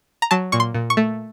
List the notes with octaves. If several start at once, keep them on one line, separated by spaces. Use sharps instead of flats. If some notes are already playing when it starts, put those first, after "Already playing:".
A#5
F#3 A5
A#2 C#6
C6
A#2
C#6
A3